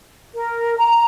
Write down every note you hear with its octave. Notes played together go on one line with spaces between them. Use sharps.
A#4
A#5